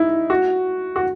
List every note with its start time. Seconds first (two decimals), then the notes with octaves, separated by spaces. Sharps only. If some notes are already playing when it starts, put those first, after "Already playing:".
Already playing: D#4 E4
0.30 F#4
0.96 F#4